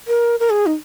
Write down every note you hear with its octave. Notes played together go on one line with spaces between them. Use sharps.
A#4
A#4
G#4
D#4